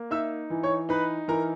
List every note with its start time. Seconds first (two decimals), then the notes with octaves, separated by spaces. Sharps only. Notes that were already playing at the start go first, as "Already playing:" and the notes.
Already playing: A#3
0.11 D#4 E5 E6
0.50 E3
0.63 C#5 C#6
0.89 D#4 B4 B5
1.28 E3 A#4 A#5